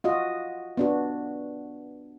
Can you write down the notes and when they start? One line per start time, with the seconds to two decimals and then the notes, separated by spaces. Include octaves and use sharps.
0.04 F4 F#4 D#5
0.77 B3 D4 F#4